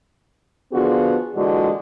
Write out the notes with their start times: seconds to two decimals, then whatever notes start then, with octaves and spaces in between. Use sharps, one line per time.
0.73 D3 F3 B3 F4 F#4 G#4
1.36 A#2 D3 E3 G#3 F#4 D5